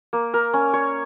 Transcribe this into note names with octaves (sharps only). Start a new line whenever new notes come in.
A#3
A#4
C#4
C#5